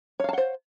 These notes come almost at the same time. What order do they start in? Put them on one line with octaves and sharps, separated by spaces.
C#5 F5 A5 F#5 C5